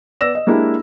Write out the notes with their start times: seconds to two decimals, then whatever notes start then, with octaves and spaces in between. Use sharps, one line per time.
0.21 B3 D5 E6 A#6 E7
0.35 D#5
0.47 G#3 A#3 D4 E4 G4